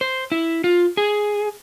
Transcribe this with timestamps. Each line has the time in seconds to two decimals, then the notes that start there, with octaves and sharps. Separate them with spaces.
0.01 C5
0.32 E4
0.64 F4
0.97 G#4